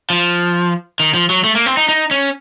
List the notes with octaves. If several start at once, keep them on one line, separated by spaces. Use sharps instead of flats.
F3
D#3
F3
F#3
A3
A#3
C4
D#4
D#4
C#4